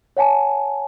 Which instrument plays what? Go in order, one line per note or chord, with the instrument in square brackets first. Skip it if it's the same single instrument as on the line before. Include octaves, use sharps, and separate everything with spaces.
[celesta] C#5 F#5 G#5 A5